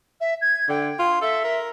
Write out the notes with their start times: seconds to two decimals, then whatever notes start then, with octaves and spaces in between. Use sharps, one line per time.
0.20 E5
0.41 G#6
0.69 D3 G5
0.99 F4
1.21 A4 E5
1.44 A#4